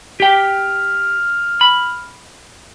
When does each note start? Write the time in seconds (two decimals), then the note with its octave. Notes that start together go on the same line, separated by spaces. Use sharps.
0.20 G4 G5 F6
1.61 B5